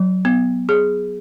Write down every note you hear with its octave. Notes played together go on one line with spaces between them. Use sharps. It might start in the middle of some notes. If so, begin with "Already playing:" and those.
Already playing: F#3
B3
G#4